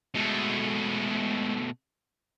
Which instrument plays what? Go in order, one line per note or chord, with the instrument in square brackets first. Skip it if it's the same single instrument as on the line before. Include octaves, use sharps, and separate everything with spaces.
[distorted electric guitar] B2 A3 [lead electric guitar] G#3